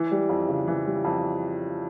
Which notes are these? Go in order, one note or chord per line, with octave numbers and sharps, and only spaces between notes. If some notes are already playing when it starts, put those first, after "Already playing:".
Already playing: E3
G3
F2
C#3
E3
G3
F2